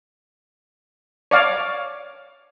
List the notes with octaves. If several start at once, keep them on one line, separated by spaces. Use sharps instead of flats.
C#5 D5 F5